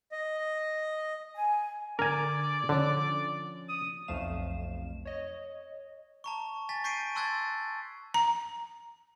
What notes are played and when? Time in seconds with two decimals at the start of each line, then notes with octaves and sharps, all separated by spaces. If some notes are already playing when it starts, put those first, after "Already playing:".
0.12 D#5
1.35 G#5
1.99 D3 A#4 D5 G#5
2.69 D3 F3 C#4
3.69 D#6
4.08 B1 F2 F3 A3 F5 E7
5.05 C#5 D#5
6.24 A5 A#5 C#6
6.69 G#5 A6 B6
6.84 C#6 G6 B6 C7 D7 D#7
7.15 A5 C6 E6 F#6 G#6 A6
8.14 A#5